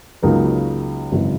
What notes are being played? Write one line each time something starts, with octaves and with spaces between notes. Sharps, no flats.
C#2 C#3 F#3 A#3 D#4
G#1 F#2 C#3 E3